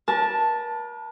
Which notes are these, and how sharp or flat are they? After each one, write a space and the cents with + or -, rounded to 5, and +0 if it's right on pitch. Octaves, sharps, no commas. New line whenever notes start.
A#4 +45 A5 +0